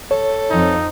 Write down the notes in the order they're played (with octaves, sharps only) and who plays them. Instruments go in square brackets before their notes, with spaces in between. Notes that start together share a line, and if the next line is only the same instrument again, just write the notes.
[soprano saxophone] A4 [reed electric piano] C#5
[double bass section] F2 F3 C4 [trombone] D#4